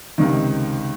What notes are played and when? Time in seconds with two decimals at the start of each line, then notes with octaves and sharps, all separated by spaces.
0.18 C#2 C3 D#3